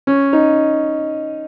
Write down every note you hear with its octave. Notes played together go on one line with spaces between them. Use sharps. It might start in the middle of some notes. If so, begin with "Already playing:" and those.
C#4
D#4